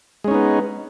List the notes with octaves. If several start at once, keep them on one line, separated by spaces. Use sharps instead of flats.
G#3 B3 C#4 D#4